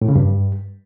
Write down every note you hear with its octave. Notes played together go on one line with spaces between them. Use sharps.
A2
C#3
G2